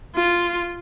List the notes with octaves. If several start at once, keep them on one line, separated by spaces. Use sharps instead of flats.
F4